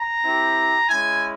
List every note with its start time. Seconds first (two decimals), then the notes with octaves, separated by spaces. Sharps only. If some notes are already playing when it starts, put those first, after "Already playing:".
Already playing: A#5
0.23 C4 E4 G4
0.89 G#3 C#4 E4 G#5